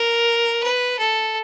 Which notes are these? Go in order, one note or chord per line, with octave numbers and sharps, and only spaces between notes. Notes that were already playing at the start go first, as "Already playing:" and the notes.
Already playing: A#4
B4
A4